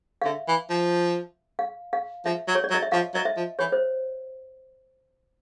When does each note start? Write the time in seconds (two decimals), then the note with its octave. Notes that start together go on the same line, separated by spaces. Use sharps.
0.22 F5
0.25 D3 E5
0.48 E3
0.70 F3
1.59 F5
1.93 F5
2.25 F3 E5
2.48 F#3
2.55 C#5
2.64 D5
2.70 F#3
2.74 D#5
2.82 E5
2.92 F3 F5
3.14 F#3 D#5
3.25 E5
3.37 F3
3.59 E3 C#5
3.72 C5